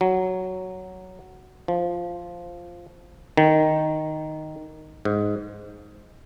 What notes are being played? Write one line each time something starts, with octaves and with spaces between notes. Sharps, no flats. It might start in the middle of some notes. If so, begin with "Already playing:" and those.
F#3
F3
D#3
G#2